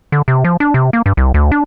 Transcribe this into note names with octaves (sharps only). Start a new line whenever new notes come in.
D3
C3
F3
D4
C3
A#3
G2
C2
D2
D4